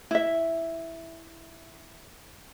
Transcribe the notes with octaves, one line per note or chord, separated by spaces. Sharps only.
E4 E5